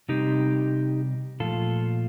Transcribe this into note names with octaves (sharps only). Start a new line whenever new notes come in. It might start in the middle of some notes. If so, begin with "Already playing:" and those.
C3 G3 C4 D#4 G4
A#2 F3 A3 F4 A4